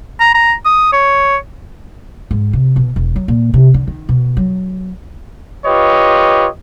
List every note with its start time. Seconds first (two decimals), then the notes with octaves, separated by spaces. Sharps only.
0.20 A#5
0.35 A#5
0.65 D#6
0.93 C#5
2.31 G#2
2.53 C3
2.76 B2
2.96 E1
3.16 F#3
3.28 A#2
3.54 C3
3.74 D3
3.87 D#3
4.09 B2
4.37 F#3
5.65 F4 G4 B4 C#5 D#5